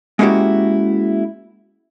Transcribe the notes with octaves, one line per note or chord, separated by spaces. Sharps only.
G#3 A#3 C#4 E4 F#4 G4